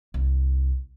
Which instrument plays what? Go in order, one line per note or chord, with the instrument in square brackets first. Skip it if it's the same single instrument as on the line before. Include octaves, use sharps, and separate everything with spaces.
[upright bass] C2